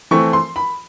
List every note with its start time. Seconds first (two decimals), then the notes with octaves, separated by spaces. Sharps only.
0.11 E3 A3 C4 C#6
0.33 C6
0.56 B5